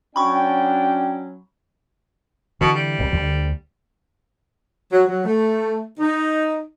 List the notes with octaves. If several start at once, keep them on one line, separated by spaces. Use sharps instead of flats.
F#3 C#4 D4 G5 B5 C#6
B2 D3 E3
G3
D1 C2
D2 D3
F#3
F#3
A3
D#4